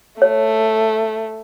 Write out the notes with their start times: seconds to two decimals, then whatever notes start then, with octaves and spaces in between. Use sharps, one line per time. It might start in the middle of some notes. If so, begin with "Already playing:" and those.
0.22 A3 C#5